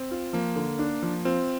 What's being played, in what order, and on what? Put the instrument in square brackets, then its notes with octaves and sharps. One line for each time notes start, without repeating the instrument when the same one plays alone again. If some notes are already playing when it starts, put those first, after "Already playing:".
Already playing: [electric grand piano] C4
[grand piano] F4
[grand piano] F3 [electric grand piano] A#3
[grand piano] D3
D4
F3
[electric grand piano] C4 [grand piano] F4